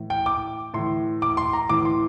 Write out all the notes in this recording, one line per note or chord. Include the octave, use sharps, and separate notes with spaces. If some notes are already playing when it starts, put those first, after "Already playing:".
Already playing: A2 E3
G5
D6
A2 E3 C6
D6
C6
A#5
A2 E3 D6
C6